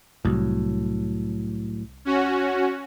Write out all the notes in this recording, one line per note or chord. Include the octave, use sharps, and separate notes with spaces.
C2 A2 F#3
C#4 F#4